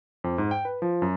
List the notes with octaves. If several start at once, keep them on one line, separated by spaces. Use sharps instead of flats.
F2
G#2
G5
B4
F3
F#2